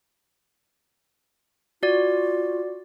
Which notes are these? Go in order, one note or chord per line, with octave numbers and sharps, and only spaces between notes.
F4 F#4 D5